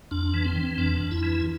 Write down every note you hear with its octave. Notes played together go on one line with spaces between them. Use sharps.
F2 D4
E3
C4
E3
F2 D4
F2
E4
E3